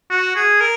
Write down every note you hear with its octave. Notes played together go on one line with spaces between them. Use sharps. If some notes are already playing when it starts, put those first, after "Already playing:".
F#4
G#4
A#4